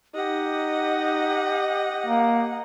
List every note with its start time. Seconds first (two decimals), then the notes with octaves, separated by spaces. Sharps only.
0.15 D#4 G4 D#5 F#5
2.06 A#3